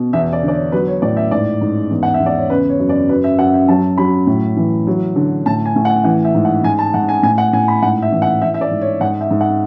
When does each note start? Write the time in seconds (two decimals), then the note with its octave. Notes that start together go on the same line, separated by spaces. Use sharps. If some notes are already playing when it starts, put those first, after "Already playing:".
Already playing: B2
0.13 E2 E5
0.33 D5
0.43 D3
0.48 D5
0.53 C#5
0.72 F#3 B4
0.88 C#5
1.02 A2 D5
1.17 E5
1.31 G#2 D5
1.61 G#2
1.91 E2
2.03 F#5
2.14 E5
2.20 E2
2.26 D5
2.38 C#5
2.50 C#3 B4
2.69 C#5
2.79 F#2
2.89 D5
3.09 F#2 B4
3.24 E5
3.39 F#2 F#5
3.54 E5
3.68 F#3 A5
3.98 F#3 B5
4.27 A2
4.57 E3
4.87 F#3
5.16 D3
5.46 A2 A5
5.66 G#5
5.76 A2
5.85 F#5
6.04 E3 F#5
6.25 E5
6.34 G#2
6.45 F#5
6.64 G#2 G#5
6.79 A5
6.94 G#2 F#5
7.09 G#5
7.23 A2 G#5
7.38 F#5
7.53 A2 G#5
7.68 B5
7.82 G#2 F#5
8.02 E5
8.12 E3
8.22 F#5
8.42 E3 E5
8.54 E5
8.61 D5
8.71 G#2
8.81 C#5
9.01 G#2 F#5
9.21 E5
9.31 G#2
9.41 F#5